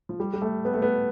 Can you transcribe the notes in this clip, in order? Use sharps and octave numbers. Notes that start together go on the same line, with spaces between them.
F3
G3
G3
A3
B3
A3
B3